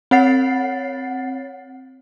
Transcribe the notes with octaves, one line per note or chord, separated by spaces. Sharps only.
C4 C#5 F#5 A6 C7